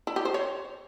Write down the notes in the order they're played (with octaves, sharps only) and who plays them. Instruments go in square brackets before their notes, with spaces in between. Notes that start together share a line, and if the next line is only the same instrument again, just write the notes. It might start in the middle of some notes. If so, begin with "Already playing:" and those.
[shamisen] E4
G4
C5
C#5